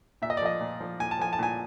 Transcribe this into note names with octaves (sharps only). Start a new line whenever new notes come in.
A#2 E5
D#5
D5
F3 D#5
A#2
F3
A#2 G#5
A5
F3 G#5
A5
A#2 G#5